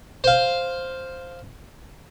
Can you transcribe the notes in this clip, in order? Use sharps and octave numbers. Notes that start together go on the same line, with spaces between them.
C5 F5